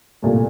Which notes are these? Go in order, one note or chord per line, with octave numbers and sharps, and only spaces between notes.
C2 A#2 A3